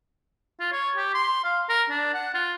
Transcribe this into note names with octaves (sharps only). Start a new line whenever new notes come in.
F4
C#5
G4
C6
F5
A#4
D4
F#5
F4